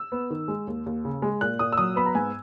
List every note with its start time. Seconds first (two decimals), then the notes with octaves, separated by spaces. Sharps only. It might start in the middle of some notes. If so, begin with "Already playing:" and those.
Already playing: E6
0.12 B3
0.30 D#3
0.48 G#3
0.67 D#2
0.86 D#2
1.05 C#3
1.22 G#3
1.41 A#2 F#6
1.59 A#2 D#6
1.72 E6
1.77 F#3 D#6
1.96 B3 B5
2.06 A#5
2.15 G#2 G#5